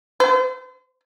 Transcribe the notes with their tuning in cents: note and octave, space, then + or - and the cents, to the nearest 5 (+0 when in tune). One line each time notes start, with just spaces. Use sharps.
C5 -40